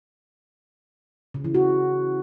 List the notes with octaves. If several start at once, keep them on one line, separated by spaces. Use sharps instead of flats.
C#3
E3
F#4